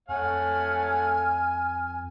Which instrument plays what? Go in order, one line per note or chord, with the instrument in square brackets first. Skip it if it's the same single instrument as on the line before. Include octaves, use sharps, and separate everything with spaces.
[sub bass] F2 [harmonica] A3 C#5 F#5 [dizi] G#5 [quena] F6